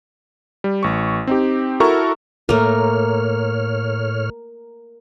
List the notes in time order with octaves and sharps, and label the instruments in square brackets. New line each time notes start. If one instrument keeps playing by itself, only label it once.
[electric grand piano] G3
A1 C#6
C4 D#4 G4
E4 F#4 A4 A#4 A#5 C#6
[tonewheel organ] A2 C#5 F6 [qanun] A3 A#3 [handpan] A#4